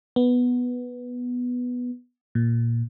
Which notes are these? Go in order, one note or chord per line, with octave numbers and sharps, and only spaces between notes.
B3
A#2